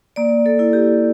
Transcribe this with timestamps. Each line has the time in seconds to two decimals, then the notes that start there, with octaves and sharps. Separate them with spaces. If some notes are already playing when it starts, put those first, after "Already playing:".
0.16 A#3 D5
0.46 A4
0.59 E4
0.73 G4